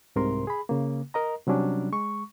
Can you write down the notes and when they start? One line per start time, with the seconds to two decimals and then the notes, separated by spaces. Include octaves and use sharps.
0.16 C2 G#2 C3 A#4 C6
0.47 G#4 B5
0.69 C#3 A#3
1.14 A#4 D#5 A#5
1.47 C3 F#3 G3 C#4 D4
1.92 G#3 C#6